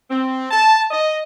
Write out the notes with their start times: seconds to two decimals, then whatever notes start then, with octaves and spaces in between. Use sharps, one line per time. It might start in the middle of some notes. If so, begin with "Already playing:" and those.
0.11 C4
0.51 A5
0.91 D#5